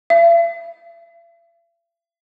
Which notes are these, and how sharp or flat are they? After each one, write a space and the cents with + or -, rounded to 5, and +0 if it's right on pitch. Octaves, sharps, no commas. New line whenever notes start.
E5 +45